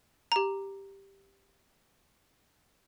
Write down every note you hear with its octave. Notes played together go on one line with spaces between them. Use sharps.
G4 A#5